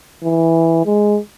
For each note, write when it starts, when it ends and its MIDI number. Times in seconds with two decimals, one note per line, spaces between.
0.24 0.84 52
0.86 1.19 56